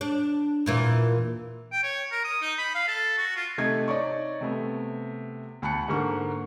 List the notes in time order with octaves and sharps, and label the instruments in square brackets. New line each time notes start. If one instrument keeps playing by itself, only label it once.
[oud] D4
E2 A#2 E3
[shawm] G5
C#5
A#4
D#6
D#4
B5
F5
A4
F#4
F4
[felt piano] C3 A3 D#4 G#6
D#4 C#5 D5 C#6
C3 A3 B3
D2 A5 B5 F#6 C#7
G#2 D3 A#3 C#6